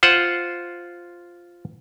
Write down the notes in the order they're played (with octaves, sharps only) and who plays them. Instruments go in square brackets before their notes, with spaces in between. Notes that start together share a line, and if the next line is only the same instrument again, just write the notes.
[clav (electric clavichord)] F4 C5 F#5